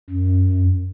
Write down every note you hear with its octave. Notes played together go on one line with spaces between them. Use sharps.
F#2